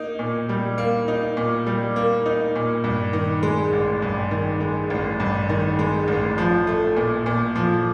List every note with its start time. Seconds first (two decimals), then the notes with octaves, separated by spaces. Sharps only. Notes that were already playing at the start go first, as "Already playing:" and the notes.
Already playing: A#3 D#4
0.19 A#2
0.49 G3
0.78 A#3
1.08 D#4
1.37 A#2
1.67 G3
1.96 A#3
2.26 D#4
2.55 A#2
2.84 G2
3.13 D#3
3.43 G#3
3.73 A1
4.02 G2
4.31 D#3
4.60 G#3
4.90 A1
5.20 G2
5.49 D#3
5.79 G#3
6.08 A1
6.38 F3
6.67 A3
6.96 A#2
7.26 A#2
7.55 F3